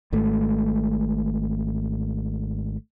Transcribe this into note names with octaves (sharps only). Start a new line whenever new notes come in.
G#1 G#2 A3